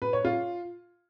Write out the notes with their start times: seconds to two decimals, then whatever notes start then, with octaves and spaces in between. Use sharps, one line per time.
0.02 B4
0.13 C#5
0.25 F4